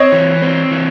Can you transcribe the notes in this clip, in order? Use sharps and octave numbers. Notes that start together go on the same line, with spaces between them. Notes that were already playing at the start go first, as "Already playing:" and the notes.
Already playing: C4 C#5 D#5
E3
C4
E3